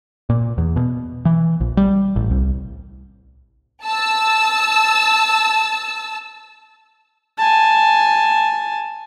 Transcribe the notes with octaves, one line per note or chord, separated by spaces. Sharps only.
A#2
E2
B2
E3
A#1
G3
A1
C2
A5 E6
G#5 A5